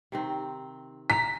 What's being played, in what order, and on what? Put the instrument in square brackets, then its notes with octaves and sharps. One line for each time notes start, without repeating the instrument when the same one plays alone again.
[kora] C3 D#3 C4
[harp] A#5 [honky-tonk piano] B6